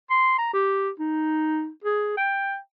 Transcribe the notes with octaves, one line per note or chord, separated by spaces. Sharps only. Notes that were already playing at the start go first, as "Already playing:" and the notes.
C6
A#5
G4
D#4
G#4
G5